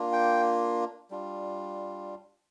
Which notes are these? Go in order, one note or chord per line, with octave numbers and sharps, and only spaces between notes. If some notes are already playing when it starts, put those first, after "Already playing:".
Already playing: A#3 D4 F4
G5
G3 D4 F4